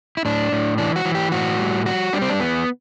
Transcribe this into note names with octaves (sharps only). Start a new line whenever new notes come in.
E4
A2 D4
A2
E3 D4
F#4
E3
G4
A2 F#4
G3
G3 F#4
G3 D4
C4
D4
E2 B3